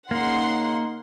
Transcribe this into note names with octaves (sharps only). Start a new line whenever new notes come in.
C#3 A#3 D#4 F#5 C6